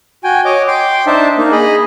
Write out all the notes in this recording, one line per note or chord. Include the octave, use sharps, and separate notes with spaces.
F#4 G5 G#5
C#5 D#5 D6
G5 C6 D6
D4 D#4 C5 E5 A5
A#3 D#4
G#4 D#5 B5